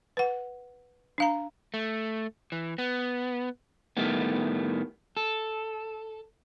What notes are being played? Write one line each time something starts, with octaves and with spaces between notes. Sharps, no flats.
B4 F#5
D4 F5 A#5
A3
E3
B3
A2 D#3 G3 A3 B3
A4